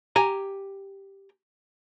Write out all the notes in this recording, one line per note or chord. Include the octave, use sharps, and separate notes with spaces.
G4 G#5 A#5